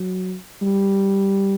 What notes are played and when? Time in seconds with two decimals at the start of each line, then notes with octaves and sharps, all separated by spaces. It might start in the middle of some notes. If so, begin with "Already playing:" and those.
Already playing: F#3
0.62 G3